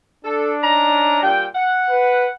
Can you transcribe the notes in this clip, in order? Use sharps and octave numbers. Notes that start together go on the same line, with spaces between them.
D4 A4
C#4 D#4 A#5
A#2 G3 G5
F#5
B4